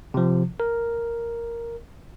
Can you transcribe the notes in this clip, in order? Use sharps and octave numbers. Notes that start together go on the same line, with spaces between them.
C3 F3
A#4